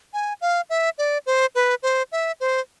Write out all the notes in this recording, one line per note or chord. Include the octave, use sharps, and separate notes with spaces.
G#5
F5
E5
D5
C5
B4
C5
E5
C5